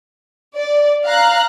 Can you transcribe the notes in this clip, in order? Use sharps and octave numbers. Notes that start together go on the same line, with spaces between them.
D5
F5 A#5 F#6